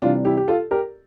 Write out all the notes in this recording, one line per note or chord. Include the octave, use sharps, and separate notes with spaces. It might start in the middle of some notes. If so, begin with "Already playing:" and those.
C3 E3 G3 D4 F4
E4 G4
G4
F4 A4
G4 A#4